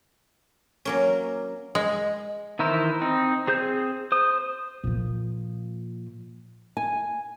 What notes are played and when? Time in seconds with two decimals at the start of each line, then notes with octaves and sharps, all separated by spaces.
0.85 F#3 A#3 C#4
1.75 G#3
2.59 D#3 E3 E4 A#4 C5
3.01 C4 D#4
3.47 C4 G#4 C5 G6
4.12 C5 D#6
4.84 A#2 F3
6.77 G#5